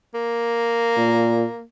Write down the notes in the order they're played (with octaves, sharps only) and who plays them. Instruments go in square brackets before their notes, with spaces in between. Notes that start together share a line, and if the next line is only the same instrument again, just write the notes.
[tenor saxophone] A#3
[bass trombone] A#2